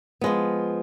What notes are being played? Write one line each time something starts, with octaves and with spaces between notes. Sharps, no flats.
F3 G#3 B3